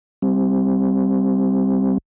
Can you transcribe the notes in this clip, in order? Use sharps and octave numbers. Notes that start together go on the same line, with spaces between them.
G3 C4